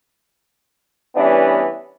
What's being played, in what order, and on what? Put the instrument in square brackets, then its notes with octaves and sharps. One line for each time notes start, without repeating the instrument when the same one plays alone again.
[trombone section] E3 G3 B3 C#4 D4